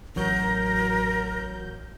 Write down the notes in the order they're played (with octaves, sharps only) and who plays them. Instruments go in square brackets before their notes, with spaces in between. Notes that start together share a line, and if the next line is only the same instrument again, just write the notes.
[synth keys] A1 F#3 G6 [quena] A#4